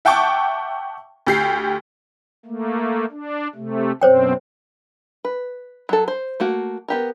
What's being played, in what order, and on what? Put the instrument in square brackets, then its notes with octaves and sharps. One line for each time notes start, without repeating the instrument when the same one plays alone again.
[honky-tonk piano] E5 F#5 G5 A5 C#6 D6
D2 G4 C7
[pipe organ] A3 A#3
D4
C3 A3
[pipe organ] F#2 B2 C4 [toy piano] C5 C#5 G5
[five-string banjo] B4
F#3 A4
C5
A3 A#3 F#4
B3 G4 A#4